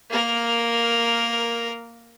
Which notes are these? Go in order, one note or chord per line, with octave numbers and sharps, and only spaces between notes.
A#3 A#4